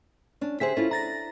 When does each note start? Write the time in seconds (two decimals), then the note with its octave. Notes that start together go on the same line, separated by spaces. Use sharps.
0.41 C#4 D4
0.60 D3 G4 G#4 C5 E5 B6
0.77 C#4 E4 F4 A4
0.91 D4 A#5 A6 A#6